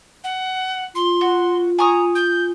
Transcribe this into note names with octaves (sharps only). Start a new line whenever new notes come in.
F#5
F4 C6
F#4
G#5 A#5 C#6 D#6
G6